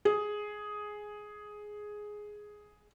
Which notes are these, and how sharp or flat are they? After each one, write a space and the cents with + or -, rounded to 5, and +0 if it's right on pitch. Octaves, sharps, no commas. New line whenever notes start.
G#4 +5